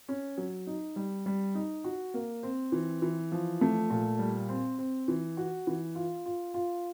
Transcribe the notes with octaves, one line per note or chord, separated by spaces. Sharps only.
C#4
F#3
D#4
G3
G3
D#4
F#4
A#3
C4
E3
E3
F3
A3
A#2
G3
C4
C4
E3
F#4
E3
F4
F4
F4